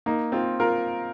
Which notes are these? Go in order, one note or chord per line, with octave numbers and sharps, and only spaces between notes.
A#3 D#4
C4 F4
F4 A#4